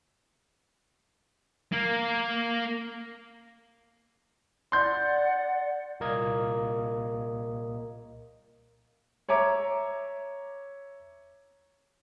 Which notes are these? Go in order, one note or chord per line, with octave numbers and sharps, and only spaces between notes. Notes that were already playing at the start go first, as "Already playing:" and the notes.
A#3
D5 F#5 C6 G6
C2 A#2 A#3 A#4 D#5 G#6
C#5 E5 A#5 D6